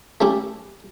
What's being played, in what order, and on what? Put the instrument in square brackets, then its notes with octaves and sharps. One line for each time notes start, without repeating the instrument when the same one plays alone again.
[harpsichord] A3 C#4 E4 G4